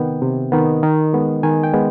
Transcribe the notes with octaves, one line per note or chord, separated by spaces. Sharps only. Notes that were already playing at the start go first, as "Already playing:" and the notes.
Already playing: C3 D#3 B3 G5
C3
D#3 B3
D#3
G#3 B3
D#3 G#5
G5
G#3 B3